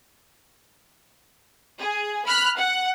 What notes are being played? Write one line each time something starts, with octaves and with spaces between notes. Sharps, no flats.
G#4
B5 F6 F#6 B6
F#5